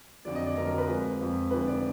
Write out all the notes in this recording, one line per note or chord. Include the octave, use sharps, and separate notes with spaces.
F2 D3 F#3 D5
D#5
D5
F2 D3 F#3 A#4
A#4
B4
F2 F3 G#3
F2 F3 G#3
F1 F2 D3 F3 G#3 B4
D5